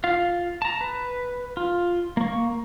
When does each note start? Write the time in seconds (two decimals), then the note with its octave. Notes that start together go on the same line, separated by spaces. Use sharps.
0.04 F4 F5
0.62 A5 A#5
0.81 B4
1.57 F4
2.17 A#3 C#6